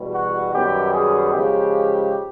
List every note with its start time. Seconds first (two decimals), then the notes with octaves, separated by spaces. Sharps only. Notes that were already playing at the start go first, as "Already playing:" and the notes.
Already playing: E2 B2 G3
0.14 F#4
0.54 F#2 D#3 G3 B3 G4
0.93 G#4
1.34 C#3 F3 G#3 G4